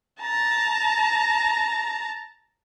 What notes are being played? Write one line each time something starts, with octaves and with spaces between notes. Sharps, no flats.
A5 A#5